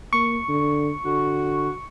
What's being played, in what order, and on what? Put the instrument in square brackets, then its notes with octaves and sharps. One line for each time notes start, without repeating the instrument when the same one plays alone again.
[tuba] A#3 [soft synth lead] C#6
[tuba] D3
[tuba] D3 [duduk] F#4